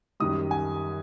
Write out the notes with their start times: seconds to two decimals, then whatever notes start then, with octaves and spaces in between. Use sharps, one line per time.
0.20 F#2 D#3 G3 D#6
0.51 G#5